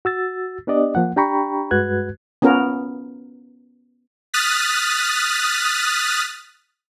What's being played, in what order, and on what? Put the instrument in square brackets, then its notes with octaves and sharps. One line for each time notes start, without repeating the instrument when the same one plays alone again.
[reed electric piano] F#4 E6 A6
B3 D4 G4 D5 D#5
F3 A#3 F#5
D4 G4 G5 A#5 B5 C#6
G2 G#3 F#4 B4 F#6 G#6
[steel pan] B3 C#4 F4 A#4
[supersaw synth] D#6 F6 F#6 A6 B6